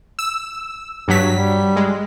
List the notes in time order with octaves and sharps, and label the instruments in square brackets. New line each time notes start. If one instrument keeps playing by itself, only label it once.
[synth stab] E6
G2 F#3 B6
[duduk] G3
[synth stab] G#3